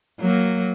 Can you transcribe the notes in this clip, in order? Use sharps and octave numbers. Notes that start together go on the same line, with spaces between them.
F#3 A#3